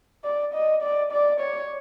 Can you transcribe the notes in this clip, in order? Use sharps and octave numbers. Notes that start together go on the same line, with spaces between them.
D5
D#5
D5
D5
C#5